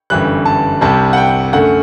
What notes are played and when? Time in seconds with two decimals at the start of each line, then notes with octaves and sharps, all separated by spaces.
0.10 G1 F#2 E3 G3 F#6
0.46 A5
0.81 C2 C3 G3 A5
1.13 F#5
1.17 G5
1.53 F#2 D3 A3 F#5